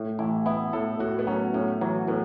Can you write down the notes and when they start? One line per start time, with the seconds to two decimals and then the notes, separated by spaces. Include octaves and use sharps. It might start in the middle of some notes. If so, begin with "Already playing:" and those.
Already playing: A2
0.19 A1 E4
0.46 B3 E4
0.73 A2 A4
1.00 A2 F#4
1.19 B3
1.27 F#3 C#4
1.54 A2 C#4
1.81 E3 F#3
2.08 A2 B3